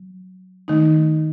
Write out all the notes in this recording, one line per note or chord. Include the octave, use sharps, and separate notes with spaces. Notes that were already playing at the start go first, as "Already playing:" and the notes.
Already playing: F#3
D#3 A3 D#4